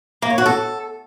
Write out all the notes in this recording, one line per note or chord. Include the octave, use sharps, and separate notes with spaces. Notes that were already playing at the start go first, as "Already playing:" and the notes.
A#3
C#5
F#4
A4